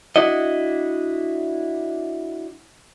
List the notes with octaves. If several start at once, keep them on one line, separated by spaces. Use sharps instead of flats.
D4 E4 F#4 D#5